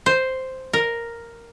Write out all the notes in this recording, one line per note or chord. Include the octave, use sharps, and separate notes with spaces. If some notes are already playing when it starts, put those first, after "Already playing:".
C5
A#4